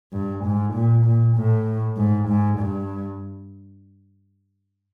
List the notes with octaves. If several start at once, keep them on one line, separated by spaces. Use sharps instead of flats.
G2
G#2
A#2
A#2
A2
G#2
G#2
G2